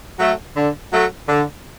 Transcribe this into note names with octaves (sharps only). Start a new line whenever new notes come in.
F#3 A3
D3
F#3 A3
D3